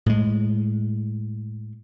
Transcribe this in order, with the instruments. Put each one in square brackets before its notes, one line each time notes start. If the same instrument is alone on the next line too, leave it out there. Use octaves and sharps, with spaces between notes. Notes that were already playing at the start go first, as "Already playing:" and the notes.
[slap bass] A2 G#3